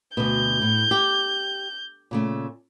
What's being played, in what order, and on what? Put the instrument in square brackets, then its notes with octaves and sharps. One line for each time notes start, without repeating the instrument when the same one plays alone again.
[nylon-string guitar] D2 B2 [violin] G6
[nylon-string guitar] A2
G4
A#2 C#3 A3